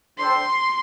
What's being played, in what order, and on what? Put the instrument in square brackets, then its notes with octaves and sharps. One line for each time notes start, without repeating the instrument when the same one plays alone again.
[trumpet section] D4 A4 C5 G5 [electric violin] C6